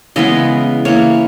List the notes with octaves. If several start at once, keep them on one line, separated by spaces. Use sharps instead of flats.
C#3 E3 G#3 B3 D#5
E3 A#3 C#5